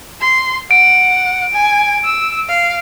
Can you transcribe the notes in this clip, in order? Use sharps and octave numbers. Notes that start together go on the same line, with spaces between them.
C6
F#5 D7
G#5
E6
F5